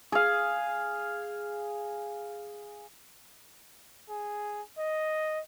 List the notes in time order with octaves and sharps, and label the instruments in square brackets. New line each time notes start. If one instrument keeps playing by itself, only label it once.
[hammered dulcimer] G#4 F5
[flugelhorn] G#4
D#5